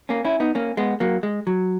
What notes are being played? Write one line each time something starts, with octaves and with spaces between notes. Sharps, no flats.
A#3 C#4
C#4 E4
B3 D#4
A#3 C#4
G#3 B3
F#3 A#3
G#3
F#3